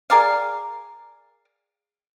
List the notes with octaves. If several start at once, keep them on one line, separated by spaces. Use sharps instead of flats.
G#4 A#4 D5 F5